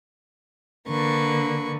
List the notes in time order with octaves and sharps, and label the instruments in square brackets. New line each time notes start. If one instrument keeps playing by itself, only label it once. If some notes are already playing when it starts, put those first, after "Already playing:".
[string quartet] D3 A#3 [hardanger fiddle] B4 C#6